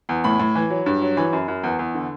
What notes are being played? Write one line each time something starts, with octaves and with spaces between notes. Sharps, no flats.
E2
A2 B5
A2
E3
F#3
G2
F#3
E3 B5
F#2
F#2
E2
E2
D3